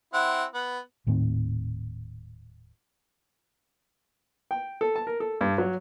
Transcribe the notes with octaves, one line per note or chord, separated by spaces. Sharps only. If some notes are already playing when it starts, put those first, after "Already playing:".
C4 E4 F#5
B3
D#1 A2 D#3 C4
G5
A4
A5
A#4
A4
G2
F#3